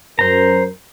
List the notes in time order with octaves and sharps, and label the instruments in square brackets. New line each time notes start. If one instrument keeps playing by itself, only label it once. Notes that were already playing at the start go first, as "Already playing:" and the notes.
[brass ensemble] F#2 A#4 [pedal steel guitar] C5 A#5